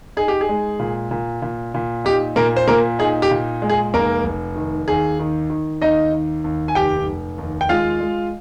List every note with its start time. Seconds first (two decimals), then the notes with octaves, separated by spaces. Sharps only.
0.17 D#4 G#4
0.28 G4
0.41 G#4
0.49 G#3
0.79 A#2
1.11 A#2
1.42 A#2
1.74 A#2
2.05 D#4 G4
2.36 A#2 A#3 A#4
2.56 C5
2.68 A#2 A#3 A#4
2.99 D#4 G#4
3.22 G4
3.31 A#2
3.62 G#3
3.70 G#4
3.94 F1 A#3 A#4
4.24 F1
4.56 D#3
4.88 D#2 G#4
5.19 D#3
5.50 D#3
5.81 D#2 D#4 D#5
6.12 D#3
6.44 D#2
6.68 G#5
6.75 F1 G4 G5
7.06 F1
7.38 D#2
7.61 G5
7.69 G#3 F4 F5
8.01 G#3